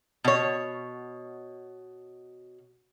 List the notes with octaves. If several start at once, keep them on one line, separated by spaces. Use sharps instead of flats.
B2 C#5